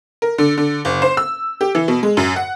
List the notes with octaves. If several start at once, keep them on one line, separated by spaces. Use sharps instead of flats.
A#4
D3
D3
F#1
C5
E6
G4
E3
B2
G#3
F#2
F#5